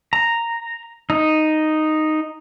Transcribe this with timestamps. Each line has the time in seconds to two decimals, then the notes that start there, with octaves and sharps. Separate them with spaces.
0.13 A#5
1.10 D#4